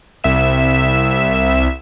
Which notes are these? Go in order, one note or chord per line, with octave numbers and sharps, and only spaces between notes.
C2 E5 E7